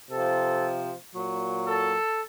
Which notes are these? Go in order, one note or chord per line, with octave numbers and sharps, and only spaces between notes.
C3 F3 A4
A#2 F#3
A4